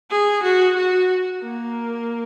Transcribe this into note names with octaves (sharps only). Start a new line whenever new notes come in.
G#4
F#4
F#4
A#3